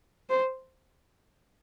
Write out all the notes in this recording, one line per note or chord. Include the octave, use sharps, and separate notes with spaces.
C5